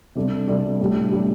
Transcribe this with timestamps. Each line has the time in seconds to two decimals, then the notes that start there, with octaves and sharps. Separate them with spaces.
0.15 C3 G3 D4 A4 D5
0.48 C3 G3 D4 A4 D5
0.80 A2 G3 D4 G4
1.12 A2 G3 D4 G4